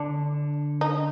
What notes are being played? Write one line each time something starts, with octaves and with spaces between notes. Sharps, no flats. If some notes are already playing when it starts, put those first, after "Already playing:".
Already playing: D3 D4
D#4